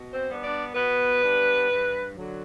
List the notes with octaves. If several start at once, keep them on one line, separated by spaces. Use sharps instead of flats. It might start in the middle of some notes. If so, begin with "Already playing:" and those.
Already playing: B2
C4 C5
G3 B3 D4
D4 D5
B2 B3 B4
G3 B3 D4
G2
D3 F#3